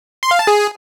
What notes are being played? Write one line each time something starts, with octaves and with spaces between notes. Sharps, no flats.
C6
F5
A5
G#4